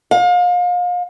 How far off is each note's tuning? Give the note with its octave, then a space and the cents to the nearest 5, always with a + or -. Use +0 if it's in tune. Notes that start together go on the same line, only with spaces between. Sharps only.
F5 +35